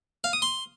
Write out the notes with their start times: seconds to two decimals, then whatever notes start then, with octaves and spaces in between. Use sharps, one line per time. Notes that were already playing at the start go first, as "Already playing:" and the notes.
0.24 F5
0.33 D#6
0.42 C6